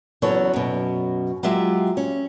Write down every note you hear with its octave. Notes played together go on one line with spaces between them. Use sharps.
E2 C#3 F#3 B3 A4 C#5
F#2 B2
F#3 G#3 F4 G4 E5
C#4